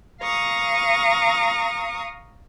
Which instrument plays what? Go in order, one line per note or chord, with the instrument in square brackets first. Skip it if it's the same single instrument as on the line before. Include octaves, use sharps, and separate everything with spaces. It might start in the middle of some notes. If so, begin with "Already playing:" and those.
[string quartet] F5 A#5 C#6 D#6